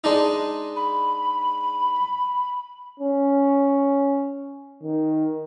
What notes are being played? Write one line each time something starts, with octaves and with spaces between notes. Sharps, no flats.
G#3 D4 D#4
B5
C#4
D#3